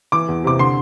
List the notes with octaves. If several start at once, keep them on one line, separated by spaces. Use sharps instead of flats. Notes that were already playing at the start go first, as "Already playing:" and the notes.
E3 D6
E2
C3 D6
D3 C6